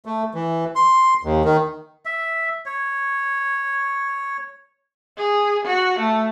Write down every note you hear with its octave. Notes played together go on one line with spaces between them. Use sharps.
A3
E3
C6
D#2
D#3
E5
C#5
G#4
F#4
A3